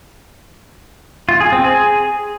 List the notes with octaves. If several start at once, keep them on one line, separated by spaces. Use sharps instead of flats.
F4
G#4
C4
G#4